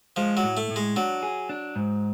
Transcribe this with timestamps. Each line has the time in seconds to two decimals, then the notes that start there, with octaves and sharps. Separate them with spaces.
0.16 F3 G#3
0.37 F#3
0.43 A2
0.57 A3
0.70 A2
0.76 G#3
0.96 F#3 D4
1.23 G#4
1.49 D4
1.76 G#2